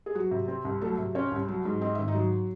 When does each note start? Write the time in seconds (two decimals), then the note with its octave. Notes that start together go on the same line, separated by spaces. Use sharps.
0.06 G#4
0.15 F#3 F#4
0.31 C3
0.48 C4
0.65 C2
0.81 F#3 A3 A4
0.98 C3
1.15 C4 C#4 C#5
1.31 C2
1.48 F#3
1.65 G#2
1.81 C4 D#5
1.95 G#1 E5
2.08 D#4 D#5
2.15 F#3